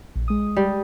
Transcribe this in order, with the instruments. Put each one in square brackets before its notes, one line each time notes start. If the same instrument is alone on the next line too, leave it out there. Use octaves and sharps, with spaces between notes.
[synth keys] A#1
G#3 D#6
[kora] G3